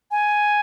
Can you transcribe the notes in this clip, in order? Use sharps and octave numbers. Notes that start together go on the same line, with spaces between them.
G#5